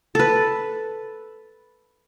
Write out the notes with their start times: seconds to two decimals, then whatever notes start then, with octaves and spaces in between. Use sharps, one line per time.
0.15 A4 B4